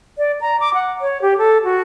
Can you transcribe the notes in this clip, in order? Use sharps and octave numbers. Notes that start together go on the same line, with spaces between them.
D5
A#5
D6
F#5
C#5
G4
A4
F#4